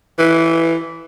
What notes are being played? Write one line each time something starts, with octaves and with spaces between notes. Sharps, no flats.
E3